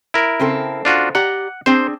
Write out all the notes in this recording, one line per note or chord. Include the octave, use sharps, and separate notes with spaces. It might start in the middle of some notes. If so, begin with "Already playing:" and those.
E4 A#4
C#3 C4 A4
D4 F4 F#4
G4 D5 F#5 A#5
C4 D4 G#4 C5